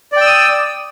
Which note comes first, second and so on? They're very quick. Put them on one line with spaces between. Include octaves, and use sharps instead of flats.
D5 G5 E6 D#6